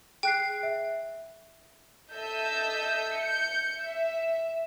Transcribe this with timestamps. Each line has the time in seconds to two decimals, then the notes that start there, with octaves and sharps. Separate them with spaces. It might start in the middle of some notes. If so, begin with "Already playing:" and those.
0.23 G#4 G5 F#6 C7
0.63 E5
2.13 A4 D#5 E5 E6 G6
3.17 G6 C#7
3.79 E5